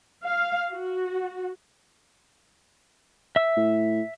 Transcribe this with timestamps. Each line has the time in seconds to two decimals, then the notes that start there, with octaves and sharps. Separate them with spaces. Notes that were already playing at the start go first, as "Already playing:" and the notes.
0.24 F5
0.71 F#4
3.36 E5 E6
3.57 A2